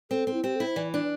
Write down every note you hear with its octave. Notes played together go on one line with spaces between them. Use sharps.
C4 A4
C4
E4
C4 G4
E4 A4
C5
E3 D5
D4 D5